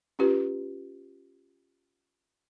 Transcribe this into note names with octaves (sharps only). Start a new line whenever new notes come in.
C#4 F4 G4 B4